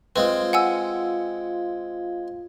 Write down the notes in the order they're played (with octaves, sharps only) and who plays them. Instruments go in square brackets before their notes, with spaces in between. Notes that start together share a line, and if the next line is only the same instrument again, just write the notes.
[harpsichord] G#3 C4 [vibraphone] F4 F5 [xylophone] B4
[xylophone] F#5 G#5 E6